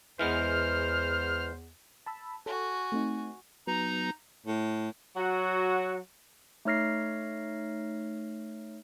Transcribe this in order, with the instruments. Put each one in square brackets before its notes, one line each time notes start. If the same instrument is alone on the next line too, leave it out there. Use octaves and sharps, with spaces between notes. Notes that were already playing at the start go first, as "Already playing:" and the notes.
[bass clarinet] E2 [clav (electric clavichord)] E3 G#3 B3 [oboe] C5 [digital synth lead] F6
[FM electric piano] A5 B5 E6
[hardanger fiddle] F#4 G#5 [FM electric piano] A4
[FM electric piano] A3 C4 D#4
[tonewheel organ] F#3 B3 [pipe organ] D#4 A#5
[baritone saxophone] A2
[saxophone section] F#3 F#4
[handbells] A3 D#4 C#5 F6 A#6 C7